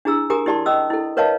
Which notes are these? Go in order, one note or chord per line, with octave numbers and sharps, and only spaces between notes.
D4 E4 G#4 A#5 E6
G4 G#4 A#4 G#5 A#5 D#6
E4 G4 D5 A5 C6
C#4 D#5 D#6 E6
E4 A4
A#4 B4 C#5 D#5 F5 A5